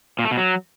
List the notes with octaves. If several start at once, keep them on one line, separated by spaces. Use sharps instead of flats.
A#2
A3
B2
F#3